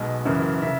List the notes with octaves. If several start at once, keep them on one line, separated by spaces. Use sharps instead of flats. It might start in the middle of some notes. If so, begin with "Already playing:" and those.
Already playing: B1 B2 G#3 D#5
F#1 F#2 C#3 E3
C#3 E5